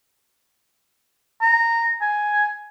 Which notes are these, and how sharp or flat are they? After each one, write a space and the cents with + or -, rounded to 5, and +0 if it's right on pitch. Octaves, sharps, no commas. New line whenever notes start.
A#5 -15
G#5 +5